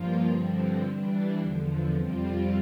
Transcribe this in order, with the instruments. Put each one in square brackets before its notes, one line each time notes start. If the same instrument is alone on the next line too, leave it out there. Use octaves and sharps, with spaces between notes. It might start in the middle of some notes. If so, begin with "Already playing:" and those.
Already playing: [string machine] G2 F3 A#3 F4
G2 D3 F3 C4
E3 G3 D4
E2 D3 F3
F2 C3 G3 C4 F4